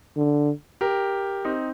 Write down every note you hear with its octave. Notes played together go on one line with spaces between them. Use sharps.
D3
G4 A#4
C4 D#4